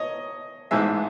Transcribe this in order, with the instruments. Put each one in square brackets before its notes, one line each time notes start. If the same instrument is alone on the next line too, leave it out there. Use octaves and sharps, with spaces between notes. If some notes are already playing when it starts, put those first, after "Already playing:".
Already playing: [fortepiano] C#5 D#5
A1 G#2 E3 G#3 E5